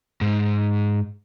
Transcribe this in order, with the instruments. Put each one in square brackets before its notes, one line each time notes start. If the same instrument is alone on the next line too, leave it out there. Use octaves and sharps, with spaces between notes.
[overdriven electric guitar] G#2